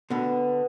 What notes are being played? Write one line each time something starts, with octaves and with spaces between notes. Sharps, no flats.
B2 D3 B3